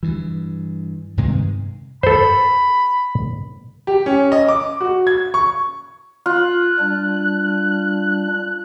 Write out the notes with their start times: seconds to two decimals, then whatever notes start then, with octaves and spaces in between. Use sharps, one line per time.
0.03 G2 E3
1.17 G2 C3 D#3 G#3
2.03 A4 C5 B5
3.87 G4
4.06 C#4
4.32 D#5
4.48 D6
4.81 F#4
5.07 G#6
5.34 C#6
6.26 F4 F#6
6.80 G3 D4